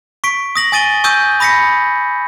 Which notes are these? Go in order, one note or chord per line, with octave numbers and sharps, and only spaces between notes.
C#6 B6 D7
D#6 A#6 F#7
G#5 D#6 A6 D7 D#7 G7
G#5 C#6 D#6 E6 G6 D#7
B5 D#6 A#6 B6 C#7